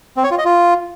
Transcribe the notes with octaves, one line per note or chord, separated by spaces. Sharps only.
C4
C#5
F4
D#5
F4